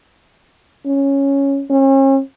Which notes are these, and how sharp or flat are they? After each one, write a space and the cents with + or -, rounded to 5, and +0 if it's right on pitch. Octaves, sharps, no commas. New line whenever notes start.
C#4 -5
C#4 -40